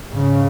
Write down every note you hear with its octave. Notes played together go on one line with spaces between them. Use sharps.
G#2 C#3